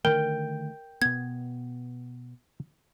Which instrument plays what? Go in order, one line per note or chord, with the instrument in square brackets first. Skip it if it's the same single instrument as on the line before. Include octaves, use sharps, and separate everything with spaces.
[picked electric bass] D3 D#3 A3 [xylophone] A#4 [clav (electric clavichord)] G5
[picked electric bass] B2 B3 [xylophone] G#6